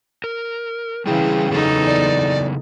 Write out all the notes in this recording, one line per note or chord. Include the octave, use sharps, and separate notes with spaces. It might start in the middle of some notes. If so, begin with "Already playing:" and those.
A#4
C#3 E3 G3 E4 G#4 G5
E2 C#3 F#3 B3 D#4 A4
D5